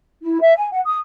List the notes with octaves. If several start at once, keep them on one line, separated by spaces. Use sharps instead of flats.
E4
E5
G#5
F#5
D#6